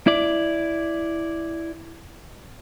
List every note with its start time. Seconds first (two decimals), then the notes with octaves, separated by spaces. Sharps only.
0.07 E4 D5